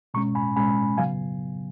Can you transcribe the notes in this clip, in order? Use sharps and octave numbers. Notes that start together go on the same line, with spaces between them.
B2 G#3 C#4 A#5 C#6
G#5 B5
B2 G#3 C#4 G#5 B5
C#3 F#3 B3 F5 G#5